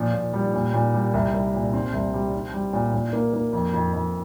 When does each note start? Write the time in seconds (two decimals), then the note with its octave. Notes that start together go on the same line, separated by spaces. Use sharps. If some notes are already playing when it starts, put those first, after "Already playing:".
Already playing: A#2 F3
0.13 A#2
0.33 G3
0.54 A#2
0.74 A#2
0.94 G3
1.14 C2
1.34 C2
1.54 A#2
1.73 C4
1.93 C2
2.13 G3
2.33 C4
2.54 G3
2.73 A#2
2.93 A#2
3.13 A#3
3.33 A#3
3.53 F2
3.73 F2
3.93 F2